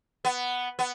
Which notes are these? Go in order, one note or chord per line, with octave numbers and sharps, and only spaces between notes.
B3
B3